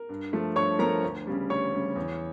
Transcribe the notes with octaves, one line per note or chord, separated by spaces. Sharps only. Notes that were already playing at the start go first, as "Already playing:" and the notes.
Already playing: A#4
G2
F3 A3
G2 C#5 C#6
F3 A3 A#4 A#5
D2
C#3 G3
D2 C#5 C#6
C#3 G3
E2